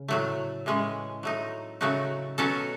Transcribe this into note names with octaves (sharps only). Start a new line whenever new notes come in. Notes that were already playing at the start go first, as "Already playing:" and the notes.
Already playing: C#3
A2 F#3 A3
A2 E3 G#3 C#4
F#3 A3 D#4
C#3 F#3 A3 D#4 F#4
B2 F#3 C#4 F#4 A4